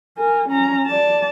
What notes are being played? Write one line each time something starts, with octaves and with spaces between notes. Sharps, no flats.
A#4 G#5
C#4 A#5
D5 A5